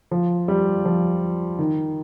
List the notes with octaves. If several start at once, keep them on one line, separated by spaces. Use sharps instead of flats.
F3
G3
F3
D#3